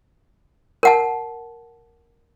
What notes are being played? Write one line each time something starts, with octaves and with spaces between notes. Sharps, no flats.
A#4 F#5 A5